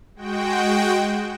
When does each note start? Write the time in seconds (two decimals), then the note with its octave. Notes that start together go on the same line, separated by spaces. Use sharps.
0.16 G#3 F#4 G5